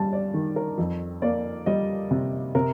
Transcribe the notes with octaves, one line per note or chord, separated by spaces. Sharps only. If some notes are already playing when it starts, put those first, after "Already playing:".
Already playing: G2 G3 A5
D5
D#3
A#4
F2
A#3 D5
G3 D#5
C3
C3 A#4